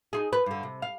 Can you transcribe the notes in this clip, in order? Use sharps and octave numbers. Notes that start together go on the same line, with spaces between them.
D#4 F4 G#4
B4
G2 D3
C3
F5